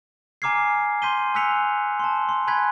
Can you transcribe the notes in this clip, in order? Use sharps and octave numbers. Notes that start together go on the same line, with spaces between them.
G#5 A#5 D6 F6 G#6 C7
C6 G6 B6 D#7 G7
G#5 E6 F#6 B6 C#7 F7
A5 C6
C6
G#5 B5 F#6 G#6 B6